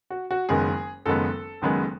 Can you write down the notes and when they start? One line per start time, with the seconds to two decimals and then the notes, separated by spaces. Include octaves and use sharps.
0.10 F#4
0.31 F#4
0.49 F#1 F#2 D#3 G#3 B3 G#4
1.05 F#1 F#2 D#3 G#3 B3 A4
1.62 F#1 F#2 D#3 G#3 B3